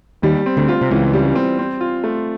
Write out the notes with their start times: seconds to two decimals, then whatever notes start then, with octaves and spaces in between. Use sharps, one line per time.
0.23 D#2 D#3 G3
0.46 C4
0.57 D2 D3
0.69 F4
0.81 C3
0.91 C#2 C#3 E3
1.13 G3
1.36 C4
1.59 C4
1.81 F4
2.04 A3